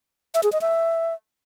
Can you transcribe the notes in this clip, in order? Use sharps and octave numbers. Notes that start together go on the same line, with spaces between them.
E5
G#4
D#5
E5